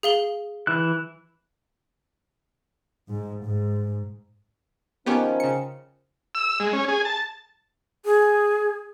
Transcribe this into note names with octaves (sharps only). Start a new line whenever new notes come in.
G#4 F5 G7
E3 E4 F#6
G#2
G#2
D#3 F3 B3 C#4 G4 C#5
C#3 C#7
E6
G#3
C#4
G#4
A5
G#4